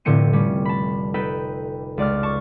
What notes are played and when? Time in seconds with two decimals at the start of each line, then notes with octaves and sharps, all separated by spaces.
0.05 F1 A2 D3 C4 C#7 D#7
0.33 G3 C#4
0.65 A5 B5
1.14 D#4 A4 B4 G5 B5
1.98 C#2 D5 D6 F6
2.23 A5 C#6